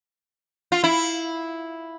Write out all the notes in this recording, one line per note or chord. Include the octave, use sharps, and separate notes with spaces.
F4
E4